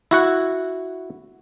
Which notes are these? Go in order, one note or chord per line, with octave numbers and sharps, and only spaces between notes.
E4 F#4 F#5